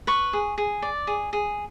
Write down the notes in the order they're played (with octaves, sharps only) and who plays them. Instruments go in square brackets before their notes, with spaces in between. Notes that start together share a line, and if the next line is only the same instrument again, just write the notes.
[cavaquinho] B4 C#6
G#4
G#4
D5
G#4
G#4